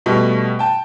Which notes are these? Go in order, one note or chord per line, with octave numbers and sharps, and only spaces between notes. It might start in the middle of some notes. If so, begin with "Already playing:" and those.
B2 G3 A3
G5 A5